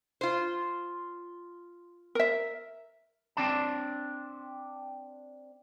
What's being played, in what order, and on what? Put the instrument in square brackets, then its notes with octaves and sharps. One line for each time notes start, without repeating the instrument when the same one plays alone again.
[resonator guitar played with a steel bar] F4 C5
[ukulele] A#4 E5
[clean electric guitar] C4 D4 A5